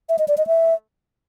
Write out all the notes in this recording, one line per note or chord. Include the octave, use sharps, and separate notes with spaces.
E5
D#5
D5
D#5
E5